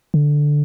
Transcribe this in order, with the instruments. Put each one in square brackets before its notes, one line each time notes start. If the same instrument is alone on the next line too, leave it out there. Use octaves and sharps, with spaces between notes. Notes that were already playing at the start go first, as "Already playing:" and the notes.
[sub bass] D3